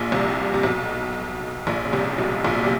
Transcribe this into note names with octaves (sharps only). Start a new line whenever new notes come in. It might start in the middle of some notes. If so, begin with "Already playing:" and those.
Already playing: A#1 A#2
C2 C3
C3
B1 B2
A#1 A#2
C#3
C2 C3
B1 B2
A#1 A#2
C3